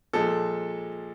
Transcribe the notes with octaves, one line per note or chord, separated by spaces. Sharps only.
A#2 F3 G#3 A4